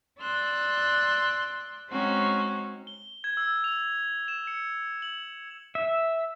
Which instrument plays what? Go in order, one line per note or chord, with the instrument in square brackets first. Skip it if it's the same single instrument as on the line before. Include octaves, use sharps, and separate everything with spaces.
[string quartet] D5 C6 E6 F#6
G#3 C4 C#4 D#4 F#4
[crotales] G7
G#6
E6
F7
E7
C#7
F#7
[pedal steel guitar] E5